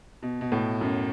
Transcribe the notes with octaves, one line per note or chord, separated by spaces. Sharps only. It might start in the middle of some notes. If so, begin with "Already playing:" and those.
B2
B2
A2
F#2